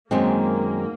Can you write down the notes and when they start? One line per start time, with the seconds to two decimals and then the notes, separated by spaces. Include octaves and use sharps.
0.10 F#2 D#3 G#3 A#3 C4 D#4